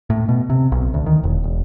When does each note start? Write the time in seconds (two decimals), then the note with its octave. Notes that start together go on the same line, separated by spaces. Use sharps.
0.10 A2
0.28 B2
0.50 C3
0.72 B1
0.94 D2
1.06 D#3
1.24 E1
1.44 E1